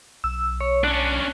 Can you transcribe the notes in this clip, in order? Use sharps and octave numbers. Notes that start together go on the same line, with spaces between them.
B1 E6
C#5
C#4 D4 F#6